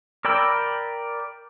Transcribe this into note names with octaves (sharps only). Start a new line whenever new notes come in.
A#4 D5 G5 B5 E6